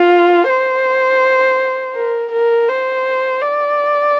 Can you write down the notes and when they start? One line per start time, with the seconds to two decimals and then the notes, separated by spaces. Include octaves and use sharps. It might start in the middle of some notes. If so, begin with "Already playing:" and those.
Already playing: F4
0.49 C5
1.95 A#4
2.32 A#4
2.68 C5
3.41 D5